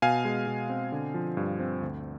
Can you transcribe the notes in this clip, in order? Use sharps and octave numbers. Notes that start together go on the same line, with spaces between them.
B2 F5 G#5
G#3
B2
C4
D3
F3
G2
C4
D2